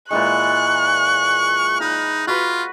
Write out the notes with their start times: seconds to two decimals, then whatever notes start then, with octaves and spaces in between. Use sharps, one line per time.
0.11 A#2 E3 G#3 C#6 F#6
1.81 D#4 B5
2.27 F4 F#4 B4